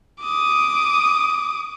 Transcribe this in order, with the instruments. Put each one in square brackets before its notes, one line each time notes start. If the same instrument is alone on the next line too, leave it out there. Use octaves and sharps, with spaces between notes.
[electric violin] D6 D#6